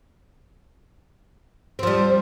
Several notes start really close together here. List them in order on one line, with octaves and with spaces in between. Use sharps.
C4 F3 G3